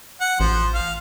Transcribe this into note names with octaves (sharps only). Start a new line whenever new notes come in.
F#5
A1 F3 C5
F5